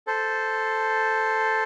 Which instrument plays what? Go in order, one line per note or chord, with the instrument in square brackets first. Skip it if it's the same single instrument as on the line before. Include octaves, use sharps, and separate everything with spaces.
[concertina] A4 C5